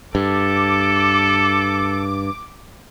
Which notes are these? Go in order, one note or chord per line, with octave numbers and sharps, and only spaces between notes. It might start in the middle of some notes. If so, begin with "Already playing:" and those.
G2 A4 D6